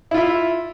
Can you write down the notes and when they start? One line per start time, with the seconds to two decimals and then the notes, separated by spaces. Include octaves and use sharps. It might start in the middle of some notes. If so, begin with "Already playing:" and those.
0.11 E4
0.14 F4
0.17 E5